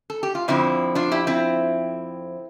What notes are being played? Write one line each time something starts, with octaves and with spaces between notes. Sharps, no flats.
A4
G4
F4
F2 D3 F3 C4 E4
D4 F4
E4 G4
C4 E4